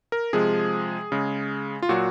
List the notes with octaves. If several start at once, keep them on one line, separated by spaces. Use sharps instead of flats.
A#4
C3 F3 G#3 G#4
C#3 G#3
F4
A#2 F#3 F#4